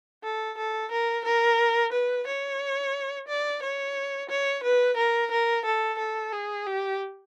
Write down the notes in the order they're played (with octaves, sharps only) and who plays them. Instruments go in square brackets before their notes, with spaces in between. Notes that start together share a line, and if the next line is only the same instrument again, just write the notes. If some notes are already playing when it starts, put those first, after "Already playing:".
[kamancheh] A4
A4
A#4
A#4
B4
C#5
D5
C#5
C#5
B4
A#4
A#4
A4
A4
G#4
G4